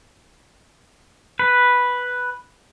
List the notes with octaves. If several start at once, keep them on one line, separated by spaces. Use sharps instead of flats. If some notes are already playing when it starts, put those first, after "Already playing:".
B4